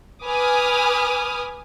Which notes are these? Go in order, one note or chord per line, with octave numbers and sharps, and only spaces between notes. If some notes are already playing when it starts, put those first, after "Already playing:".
B4 G#5 D6 D#6 F6